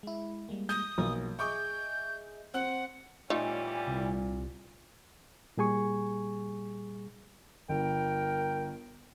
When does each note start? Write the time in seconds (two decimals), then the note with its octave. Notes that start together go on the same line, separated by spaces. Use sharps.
0.03 G#3 E4
0.49 G3 G#3 A#3
0.69 D#6 G6
0.98 B1 F3 A#3
1.39 G#4 D#5 E5 C#6 D6 G6
2.54 C4 F#5 F#6 F#7
3.30 A#2 E3 G3 A3 C#4 D#4 F4
3.87 C2
5.57 A#2 G3 G#4 G#5 C#6
7.69 G1 A#4 G5